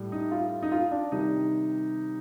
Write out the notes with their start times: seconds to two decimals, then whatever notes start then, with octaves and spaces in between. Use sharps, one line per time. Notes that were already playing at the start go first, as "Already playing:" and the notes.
Already playing: A2 G3
0.12 D#4
0.31 F4
0.62 D#4
0.72 F4
0.91 D4
1.12 C3 D#3 G3 D#4